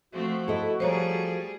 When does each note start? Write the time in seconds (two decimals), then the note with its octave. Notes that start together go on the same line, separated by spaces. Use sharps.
0.13 F3 A3 C4 F#4
0.48 E4 A4 D#5
0.80 F3 G3 G#4 A4 C5 C#5 A#5